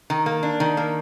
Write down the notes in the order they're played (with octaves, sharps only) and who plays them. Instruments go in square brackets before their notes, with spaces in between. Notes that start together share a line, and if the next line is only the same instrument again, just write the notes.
[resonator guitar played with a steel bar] D#3
A#3
D4
D#3
A#3